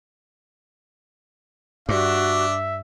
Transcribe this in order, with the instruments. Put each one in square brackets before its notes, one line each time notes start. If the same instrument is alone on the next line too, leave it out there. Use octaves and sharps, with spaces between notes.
[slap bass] G2 [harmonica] D4 [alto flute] F#4 [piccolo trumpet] E5